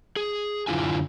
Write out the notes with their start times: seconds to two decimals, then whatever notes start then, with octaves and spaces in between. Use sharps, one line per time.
0.16 G#4
0.67 F#2 D3 E4 F4 G#5